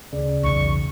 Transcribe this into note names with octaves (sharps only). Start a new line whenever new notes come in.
D2 C#3 D5
B1 E2 C#6